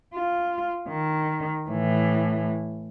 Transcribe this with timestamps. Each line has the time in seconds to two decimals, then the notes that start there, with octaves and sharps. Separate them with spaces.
0.14 F4
0.89 D#3
1.70 A2 E3